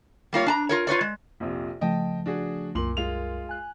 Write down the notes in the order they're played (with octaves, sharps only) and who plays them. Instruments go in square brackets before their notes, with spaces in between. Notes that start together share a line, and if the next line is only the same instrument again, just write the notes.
[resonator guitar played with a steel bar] G3 A#3 F4 C#5
D4 A5 A#5
F4 A#4 C#5
F4 B4 C#5 D5
G#3
[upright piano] A#1 F2 C3
[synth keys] C#3 F3 A3 [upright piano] D#5 G5 A5
[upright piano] D4 F#4 G#4
[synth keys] C2 F#2 A#4 [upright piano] A#2 C6 F#7
[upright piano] G#3 F4 F7
[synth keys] G#5 F#6